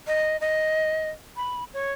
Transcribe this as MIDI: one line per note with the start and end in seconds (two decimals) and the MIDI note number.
0.07 0.37 75
0.41 1.10 75
1.36 1.64 83
1.74 1.93 73